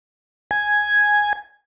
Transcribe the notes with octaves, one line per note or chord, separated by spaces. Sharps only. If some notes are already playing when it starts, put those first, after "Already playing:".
G#5